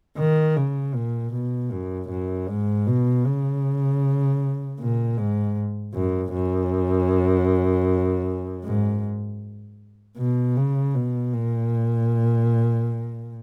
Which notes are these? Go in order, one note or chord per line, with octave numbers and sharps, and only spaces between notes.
D#3
C#3
A#2
B2
F#2
F#2
G#2
B2
C#3
A#2
G#2
F#2
F#2
G#2
B2
C#3
B2
A#2